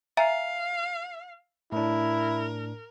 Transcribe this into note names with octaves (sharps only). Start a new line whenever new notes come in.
E5 F5 G#5 A#5
A2 D4 E4 A#4